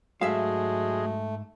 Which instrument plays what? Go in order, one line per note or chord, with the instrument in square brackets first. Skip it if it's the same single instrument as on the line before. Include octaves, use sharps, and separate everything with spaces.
[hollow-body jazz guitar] G#2 E5 F5 [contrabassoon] F#3 [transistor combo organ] G#3 [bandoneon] A3